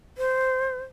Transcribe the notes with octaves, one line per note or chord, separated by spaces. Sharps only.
C5